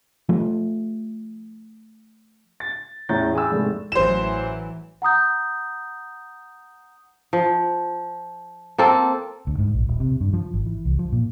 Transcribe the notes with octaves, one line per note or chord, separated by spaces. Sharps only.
F3 A3
A6
E2 A2 C#4 A#5 G6 A6
G#4 G5 G#5 B5 E6
F1 G#2 A3
A1 E3 F#3 C5 E7
F#5 A#5 D#6 G6
F3
A#3 C4 A4
D2
G#2
A#1
D#1
C3
G2
F3
G#1
E3
C2
F3
A#2